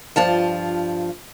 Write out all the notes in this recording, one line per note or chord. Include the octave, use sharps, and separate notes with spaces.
G2 F3 F4 A5